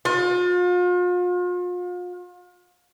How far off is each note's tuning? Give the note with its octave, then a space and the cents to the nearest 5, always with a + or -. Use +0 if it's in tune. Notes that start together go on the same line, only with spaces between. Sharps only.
F4 +40